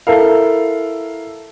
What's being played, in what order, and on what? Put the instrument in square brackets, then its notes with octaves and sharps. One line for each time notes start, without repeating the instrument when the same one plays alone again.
[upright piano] E4 A4 A#4 F5